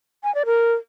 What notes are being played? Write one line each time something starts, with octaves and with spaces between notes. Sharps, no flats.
G#5
D5
A#4